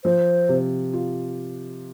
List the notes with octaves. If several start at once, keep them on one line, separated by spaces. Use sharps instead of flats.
F3 C5
C3
F4